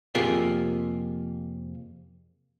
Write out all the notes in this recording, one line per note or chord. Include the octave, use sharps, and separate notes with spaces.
F2 C3 A#3 F4 G#4 E5